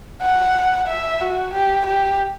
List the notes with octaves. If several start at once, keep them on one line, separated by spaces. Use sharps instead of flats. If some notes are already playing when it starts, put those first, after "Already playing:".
F#5
E5
F#4
G4
G4